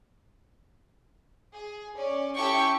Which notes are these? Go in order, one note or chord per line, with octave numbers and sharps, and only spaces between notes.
G#4
C#4 D5
C#4 E4 G4 A4 G5 C#6